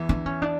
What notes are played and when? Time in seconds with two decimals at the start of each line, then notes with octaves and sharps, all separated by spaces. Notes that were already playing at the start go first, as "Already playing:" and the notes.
Already playing: E2 E3
0.09 D4
0.26 C#4
0.42 D4